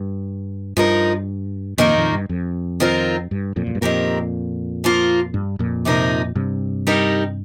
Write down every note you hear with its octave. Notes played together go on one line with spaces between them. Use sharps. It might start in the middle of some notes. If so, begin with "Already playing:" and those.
Already playing: G2
G2 F3 D#4 A#4
F2 A#2 D#3 A#3 D#4 A#4
F2 A#2
G2
F2
D#3 C4 F4 A#4
G2
F2 A#2
F2
G2
F2 A#2 D#3 C4 G4 A#4
F3 A#3 F4 A#4
G2
F2 A#2
C3 F3 D#4 A#4
G2 C3
G3 D#4 G4 A#4